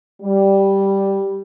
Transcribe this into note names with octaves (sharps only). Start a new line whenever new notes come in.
G3